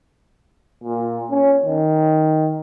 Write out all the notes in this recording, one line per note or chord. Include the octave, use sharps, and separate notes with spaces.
A#2
C#4
D#3